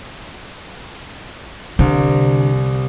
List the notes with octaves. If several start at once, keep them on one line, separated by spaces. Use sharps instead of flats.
C2 D3